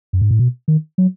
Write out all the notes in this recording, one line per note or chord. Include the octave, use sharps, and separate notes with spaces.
F#2
G#2
A2
B2
D#3
F#3